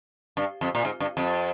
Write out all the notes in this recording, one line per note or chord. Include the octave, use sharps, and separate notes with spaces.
G2
F2
A#2
G#2
G2
F2